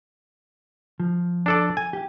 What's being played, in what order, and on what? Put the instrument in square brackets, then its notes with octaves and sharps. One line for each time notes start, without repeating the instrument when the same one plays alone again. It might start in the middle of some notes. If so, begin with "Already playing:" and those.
[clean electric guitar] F3
[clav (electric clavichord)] D4 A4 D5
G#5
[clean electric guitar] G4